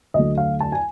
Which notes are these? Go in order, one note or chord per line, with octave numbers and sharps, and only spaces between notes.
D2 D3 F#3 A3 D#5
F5
A5
G#5